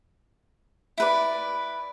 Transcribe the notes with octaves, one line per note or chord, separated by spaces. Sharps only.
E4 B4 D5